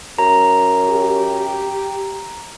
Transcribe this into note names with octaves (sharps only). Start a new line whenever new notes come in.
F#2 A#5
G4